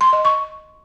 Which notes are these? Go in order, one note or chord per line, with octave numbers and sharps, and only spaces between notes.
C6
D#5
C#6